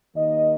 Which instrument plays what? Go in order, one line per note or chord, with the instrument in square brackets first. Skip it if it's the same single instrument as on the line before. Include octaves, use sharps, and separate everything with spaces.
[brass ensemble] D#2 D#3 A#3 D#5